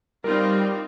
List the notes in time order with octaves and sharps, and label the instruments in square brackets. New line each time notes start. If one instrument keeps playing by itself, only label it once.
[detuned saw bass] G3 [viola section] C4 D#4 F4 [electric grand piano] A#4